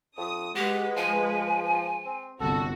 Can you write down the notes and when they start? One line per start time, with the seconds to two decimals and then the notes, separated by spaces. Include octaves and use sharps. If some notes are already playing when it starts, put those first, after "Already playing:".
0.17 F2 D#6
0.56 G#3 F#4 G4 B4
0.96 F3 G#5
2.06 C4
2.40 G1 C2 F#4 A4